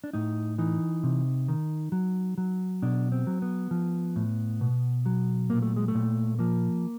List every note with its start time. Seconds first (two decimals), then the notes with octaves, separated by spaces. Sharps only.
0.04 D4
0.13 A2 D#4
0.58 E3 D#4
1.03 C3
1.48 D#3
1.92 F#3
2.38 F#3
2.82 B2 D4
3.12 C4
3.27 F#3
3.42 B3
3.71 F3
4.16 A2
4.61 B2
5.06 F#3
5.50 A#2 A#3
5.62 A3
5.76 G#3
5.88 A3
5.95 A#2
6.39 F3 A#3